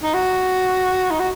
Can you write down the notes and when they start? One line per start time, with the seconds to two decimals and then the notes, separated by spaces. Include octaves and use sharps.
0.03 D#4
0.14 F#4
1.11 D#4
1.20 F#4